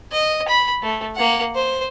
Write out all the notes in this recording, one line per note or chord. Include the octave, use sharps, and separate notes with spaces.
D#5
B5
A3
A#3 F#5
C5